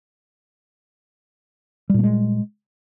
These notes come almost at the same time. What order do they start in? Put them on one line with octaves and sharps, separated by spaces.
G3 A#2 A#3 G#3